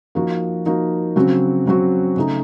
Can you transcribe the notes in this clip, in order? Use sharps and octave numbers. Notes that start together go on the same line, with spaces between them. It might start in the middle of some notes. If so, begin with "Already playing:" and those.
F3 A#3 D#4 F#4
F3 A#3 D#4 F#4
C#3 F#3 C4 F#4
C#3 F#3 C4 F#4
C#3 A3 D#4